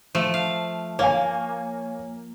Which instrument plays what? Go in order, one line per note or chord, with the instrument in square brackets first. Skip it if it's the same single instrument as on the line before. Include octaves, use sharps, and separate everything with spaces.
[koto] F3 A3
F5
[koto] A#3 [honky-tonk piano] C#5 F5 G#5